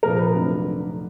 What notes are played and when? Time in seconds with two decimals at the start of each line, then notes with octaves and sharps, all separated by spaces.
0.03 A#1 A#2 F3 A#4
0.19 B4
0.34 F1 F2 D3 F#3 D4